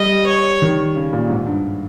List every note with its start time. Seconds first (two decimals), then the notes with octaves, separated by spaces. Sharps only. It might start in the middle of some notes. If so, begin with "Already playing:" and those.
Already playing: G3 D#5
0.27 C#5
0.62 D#3
0.96 C#3
1.13 A#2
1.30 G#2
1.46 G2